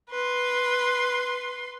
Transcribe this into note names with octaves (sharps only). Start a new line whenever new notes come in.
B4 C6